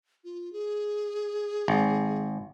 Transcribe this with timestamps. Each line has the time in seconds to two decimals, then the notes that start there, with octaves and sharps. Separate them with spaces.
0.24 F4
0.53 G#4
1.68 G#1